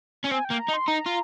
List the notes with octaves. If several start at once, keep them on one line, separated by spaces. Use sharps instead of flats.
C#4
C4 G#5
G5
A#3
A#5
D#4
C6
D#4 A#5
F4